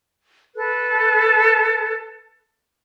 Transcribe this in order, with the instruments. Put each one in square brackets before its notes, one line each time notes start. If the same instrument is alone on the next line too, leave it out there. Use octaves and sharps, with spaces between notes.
[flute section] A4 B4 F#6